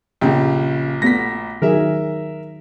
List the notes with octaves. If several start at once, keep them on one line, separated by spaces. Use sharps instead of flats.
A#1 C#3 G4
A3 B3 A#6 B6
D#3 F#3 G#4 A#4 E5